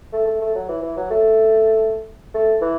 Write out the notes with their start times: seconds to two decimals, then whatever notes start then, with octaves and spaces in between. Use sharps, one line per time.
0.13 A3
0.27 A3
0.41 A3
0.55 F#3
0.68 E3
0.82 E3
0.97 F#3
1.11 A3
2.34 A3
2.61 E3